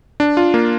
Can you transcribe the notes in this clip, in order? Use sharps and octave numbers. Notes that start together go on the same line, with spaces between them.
D4
F4
A#3